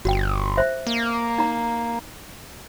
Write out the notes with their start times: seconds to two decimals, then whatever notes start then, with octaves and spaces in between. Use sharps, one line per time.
0.05 G1 F#4 G5
0.57 C5 E5
0.87 A#3
1.38 D#4 A#5